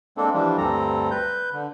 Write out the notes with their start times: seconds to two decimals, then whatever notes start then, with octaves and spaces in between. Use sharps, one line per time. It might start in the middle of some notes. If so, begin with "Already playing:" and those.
0.17 G#3 A#3 C4 D4 A4
0.33 E3 F3 G3 D4
0.58 D2 G2 G3 C4 A4 A#5
1.11 B4 G6
1.53 D3